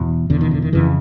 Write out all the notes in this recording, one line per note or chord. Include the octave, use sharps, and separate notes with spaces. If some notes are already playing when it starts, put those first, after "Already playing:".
Already playing: E2 B2
E2 B2 D3
D#3
D3
D#3
F2 C#3 E3